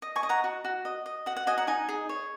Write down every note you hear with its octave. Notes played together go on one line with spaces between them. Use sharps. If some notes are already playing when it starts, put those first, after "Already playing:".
D#5
G#5 C#6
D#5
F#5 A#5
F#4
F#4
D#5
D#5
F#4 F#5
F#5
F#4 D#5 G#5
F#5 A#5
D#4 D#5 G#5
G#4
C#5